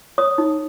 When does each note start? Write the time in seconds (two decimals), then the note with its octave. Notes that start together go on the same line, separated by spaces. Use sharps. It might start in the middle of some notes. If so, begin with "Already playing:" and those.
0.18 C#5 D#6
0.38 D#4